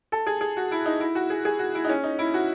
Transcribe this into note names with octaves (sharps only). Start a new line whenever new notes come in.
A4
G#4
G#4
F#4
E4
D#4
E4
F#4
G#4
G#4
F#4
E4
D#4
C#4
D#4
E4
F#4